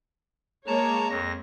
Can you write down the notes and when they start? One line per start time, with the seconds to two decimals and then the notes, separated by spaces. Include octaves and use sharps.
0.67 G#3 A#3 C#5 A5 A#5
1.10 F2 A#6